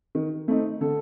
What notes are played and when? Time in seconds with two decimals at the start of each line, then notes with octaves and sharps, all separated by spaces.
0.15 D#3
0.48 A3 C4 D#4
0.81 D3 A4